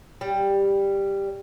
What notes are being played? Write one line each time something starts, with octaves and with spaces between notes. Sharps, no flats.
G3